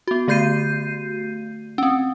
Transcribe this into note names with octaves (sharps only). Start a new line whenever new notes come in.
B3 F#4
D3 A3 F#4 G6 C7 D#7
C4 C#4